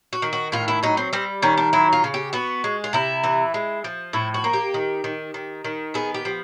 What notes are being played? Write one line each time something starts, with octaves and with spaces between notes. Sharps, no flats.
F#4
D#3
F#4
A2 F4
E4
F#3 D#4
C4
G3 C4
D#3 C#4
D4
F#3 E4
F4
C#3
G4
B3 F#4
G#3
F4
C3 E4
E3
G#3
F3
A2 E4
F#4
A#3
G4
D#3
D#3
D#3
D#3
B3 G#4
G4
F3